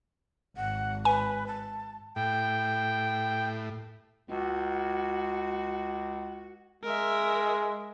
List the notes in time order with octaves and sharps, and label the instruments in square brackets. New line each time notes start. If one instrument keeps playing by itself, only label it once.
[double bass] G#1 G#2 [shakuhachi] F#5
[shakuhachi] B4 [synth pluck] G#5
[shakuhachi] A5
[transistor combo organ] A2 [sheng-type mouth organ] G5
[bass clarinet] C#2 [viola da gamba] F#4
[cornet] G#3 [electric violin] A#4 E5